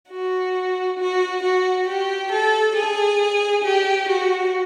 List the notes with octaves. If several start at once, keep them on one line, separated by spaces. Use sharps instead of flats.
F#4
F#4
F#4
G4
A4
G#4
G4
F#4